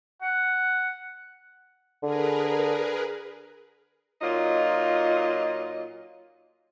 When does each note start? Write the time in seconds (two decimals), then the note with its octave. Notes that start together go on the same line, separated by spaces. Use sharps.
0.22 F#5
2.03 D3 G#4 A#4 B4
4.22 A#2 F#3 D#4 F4 D#5